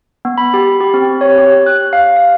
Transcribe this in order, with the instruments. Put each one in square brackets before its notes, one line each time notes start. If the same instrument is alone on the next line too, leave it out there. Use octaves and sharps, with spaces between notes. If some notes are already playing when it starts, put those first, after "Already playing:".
[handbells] B3
B5
G4
G4
C4
C#5
G4
F#6
F5
F5